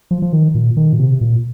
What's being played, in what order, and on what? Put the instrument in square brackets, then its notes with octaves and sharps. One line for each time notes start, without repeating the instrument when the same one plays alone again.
[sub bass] F3
F3
D#3
A#2
D#3
A#2
C3
A#2